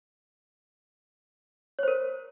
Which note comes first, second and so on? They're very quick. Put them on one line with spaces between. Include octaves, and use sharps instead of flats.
C#5 C5 A#4